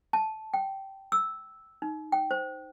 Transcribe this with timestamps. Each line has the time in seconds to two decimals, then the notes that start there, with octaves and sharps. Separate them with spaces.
0.13 A5
0.54 G5
1.12 E6
1.82 D#4
2.12 G5
2.31 C5